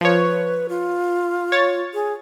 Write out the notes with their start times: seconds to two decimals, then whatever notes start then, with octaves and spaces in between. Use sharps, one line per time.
0.01 F3 B4 C#5
0.69 F4
1.52 C#5 A6
1.94 G#4